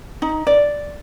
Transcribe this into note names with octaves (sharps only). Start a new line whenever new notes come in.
D#4
D5